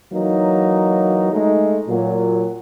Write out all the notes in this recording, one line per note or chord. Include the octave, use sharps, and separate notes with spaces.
E3 F#3 A#3 D#4
G#3 A3 D#4
A#2 F#3